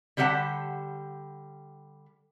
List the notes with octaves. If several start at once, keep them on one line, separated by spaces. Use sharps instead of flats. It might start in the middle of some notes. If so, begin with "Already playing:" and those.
D3 G3 G4 C#5 F#5 A5